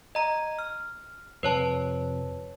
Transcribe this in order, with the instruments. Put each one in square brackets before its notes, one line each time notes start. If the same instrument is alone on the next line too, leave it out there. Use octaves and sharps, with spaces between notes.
[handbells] D#5 A#5
F6
[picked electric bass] F2 C3 [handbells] B4 C#5 A5